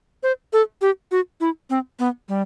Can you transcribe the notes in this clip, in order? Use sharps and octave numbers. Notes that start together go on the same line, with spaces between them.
C5
A4
G4
F#4
E4
C4
B3
G3